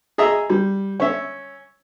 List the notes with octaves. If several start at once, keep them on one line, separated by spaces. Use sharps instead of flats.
G#4 D#5 E5 A#5
G3
C#4 E5